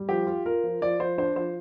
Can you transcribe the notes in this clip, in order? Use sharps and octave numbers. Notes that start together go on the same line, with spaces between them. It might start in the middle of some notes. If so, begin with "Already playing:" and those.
Already playing: G3
F3 G4
F4
F4 A#4
F3
F3 D5
F3 C5
D4 C5
F3 C5